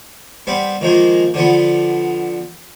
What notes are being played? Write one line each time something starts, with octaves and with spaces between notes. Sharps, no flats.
G3 B3 C4
D#3 F3 G#3 A#3
D3 F3 B3